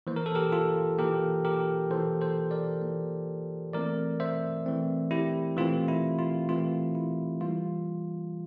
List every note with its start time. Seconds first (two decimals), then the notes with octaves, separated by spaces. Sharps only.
0.07 E3 A#3 C5
0.16 A#4
0.26 A4
0.35 G4 A#4
0.52 F4 A4
0.98 E3 A#3 G4 A#4
1.45 G4 A#4
1.90 E3 A#3 A4 C5
2.21 A4 C5
2.51 A#4 D5
2.82 E3 A#3
3.73 E3 A3 C4 A#4 D5
4.20 C5 E5
4.66 E3 A3 C4
5.11 E4 G4
5.57 E3 A3 C4 F4
5.88 E4
6.19 F4
6.49 E3 A3 C4 F4
6.95 E4
7.40 E3 G3 A#3 F4